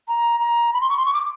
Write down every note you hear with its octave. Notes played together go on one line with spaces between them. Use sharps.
A#5
A#5
B5
C6
C#6
C6
C#6
D6